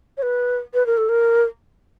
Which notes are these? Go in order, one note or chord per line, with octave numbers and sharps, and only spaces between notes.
C#5
B4
B4
A#4
A4
A#4